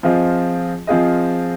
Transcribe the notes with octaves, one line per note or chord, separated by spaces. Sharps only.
F3 C4 F4 G#4 D#5
F3 C4 F4 G#4 D#5